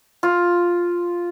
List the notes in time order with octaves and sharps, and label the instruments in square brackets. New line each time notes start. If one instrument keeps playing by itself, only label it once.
[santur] F4